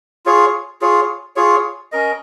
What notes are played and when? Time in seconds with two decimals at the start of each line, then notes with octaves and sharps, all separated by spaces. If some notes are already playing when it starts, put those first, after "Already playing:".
0.26 F4 G#4 C#5
0.81 F4 G#4 C#5
1.36 F4 G#4 C#5
1.92 C#4 A#4 D#5